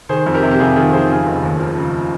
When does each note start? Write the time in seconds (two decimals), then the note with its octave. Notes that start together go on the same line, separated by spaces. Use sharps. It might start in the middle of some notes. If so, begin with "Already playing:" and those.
0.09 D#3 G#4 C5
0.26 F2
0.34 G4 A#4
0.43 C3
0.51 G4
0.59 F2 F4 G#4
0.76 D#3 F4 G#4
0.92 F2 G#4 C5
1.09 C#3 F4 G#4
1.26 F1
1.43 D#2
1.59 F3
1.77 C#3